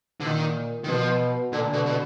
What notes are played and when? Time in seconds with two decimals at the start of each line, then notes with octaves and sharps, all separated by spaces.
0.20 D3
0.26 A#2 D#3
0.84 D#3
0.88 B2 F3
1.53 A#2 D3
1.73 B2
1.86 B2